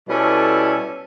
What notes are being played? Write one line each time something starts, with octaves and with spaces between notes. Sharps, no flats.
B2 G3 C#4 E4 A4